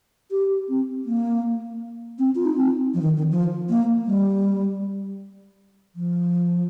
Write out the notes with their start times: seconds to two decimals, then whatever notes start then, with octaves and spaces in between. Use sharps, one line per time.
0.31 G4
0.69 C4
1.05 A#3
2.19 C4
2.35 F4
2.45 D#4
2.57 C4
2.94 F3
3.01 D#3
3.17 D#3
3.31 F3
3.69 A#3
4.07 G3
5.95 F3